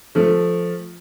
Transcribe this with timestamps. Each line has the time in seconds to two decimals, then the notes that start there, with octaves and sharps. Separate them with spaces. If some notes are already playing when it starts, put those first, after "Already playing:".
0.15 F3 A3